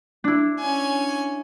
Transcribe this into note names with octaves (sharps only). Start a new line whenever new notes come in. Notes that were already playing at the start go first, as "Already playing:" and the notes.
D4 E4
C#4 G#5